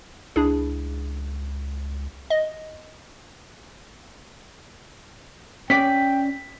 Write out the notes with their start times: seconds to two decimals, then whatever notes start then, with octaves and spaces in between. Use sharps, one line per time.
0.36 C#2 D4 E4 G#4
2.30 D#5
5.70 C#4 D5 G5 B6